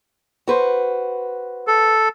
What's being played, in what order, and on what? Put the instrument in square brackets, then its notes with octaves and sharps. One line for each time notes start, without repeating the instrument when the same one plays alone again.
[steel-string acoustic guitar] F#4 B4 C5
[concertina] A4